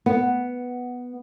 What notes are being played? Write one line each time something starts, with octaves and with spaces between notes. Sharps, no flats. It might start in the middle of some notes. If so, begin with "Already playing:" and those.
B3